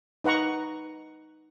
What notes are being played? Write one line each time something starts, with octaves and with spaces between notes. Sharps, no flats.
D#4 B4 F#5 A#5 C#6